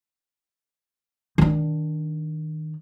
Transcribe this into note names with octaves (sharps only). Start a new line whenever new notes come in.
D#3 D4